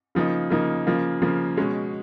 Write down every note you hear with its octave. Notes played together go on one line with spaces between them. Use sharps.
C#3 F3 A#3 D#4
C#3 F3 A#3 D#4
C#3 F3 A#3
C#3 F3 A#3
B2 G#3 C#4